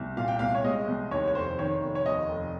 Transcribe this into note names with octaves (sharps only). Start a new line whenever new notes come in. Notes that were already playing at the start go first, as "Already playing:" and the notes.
Already playing: C2
A#2 F5
G5
C2 F5
C#5
G#3 D#5
C2
D#2 C#5
C#5
F1 C5
D#3 C#5
F1
C#5
D#2 D#5
F1